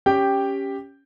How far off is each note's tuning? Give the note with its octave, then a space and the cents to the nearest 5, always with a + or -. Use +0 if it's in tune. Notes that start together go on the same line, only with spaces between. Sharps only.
C#4 +0 G4 +5 G5 +0